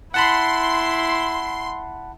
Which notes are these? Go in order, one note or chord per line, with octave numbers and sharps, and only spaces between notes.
E4 F#5 A5 B5 C6